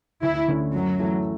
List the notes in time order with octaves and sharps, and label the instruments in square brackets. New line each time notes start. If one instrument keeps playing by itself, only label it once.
[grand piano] D2 [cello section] E4
[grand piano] D3 A3 C#4
[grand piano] F#2 [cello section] F#3
[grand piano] E3 A3 E4